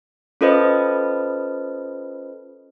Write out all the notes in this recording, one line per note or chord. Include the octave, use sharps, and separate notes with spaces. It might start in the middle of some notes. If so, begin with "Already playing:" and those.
C#4 F4 A4 B4 C5 D#5